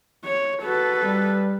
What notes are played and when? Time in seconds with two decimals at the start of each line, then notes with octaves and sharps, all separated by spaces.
0.25 C#5
0.62 F#4 A4 B4
1.03 G3